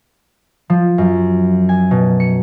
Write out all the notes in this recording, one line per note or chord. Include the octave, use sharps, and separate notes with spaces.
F3
F#2
G#5
B2
C#7